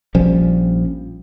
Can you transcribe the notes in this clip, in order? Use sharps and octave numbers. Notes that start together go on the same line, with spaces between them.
A#1 F3 G3 C#4